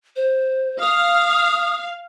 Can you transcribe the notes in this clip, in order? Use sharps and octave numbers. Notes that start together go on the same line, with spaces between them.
C5
F5 D#6